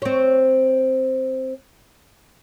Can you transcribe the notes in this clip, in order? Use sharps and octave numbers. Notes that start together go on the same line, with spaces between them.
C4 C#5